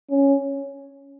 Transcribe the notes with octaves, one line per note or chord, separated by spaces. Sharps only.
C#4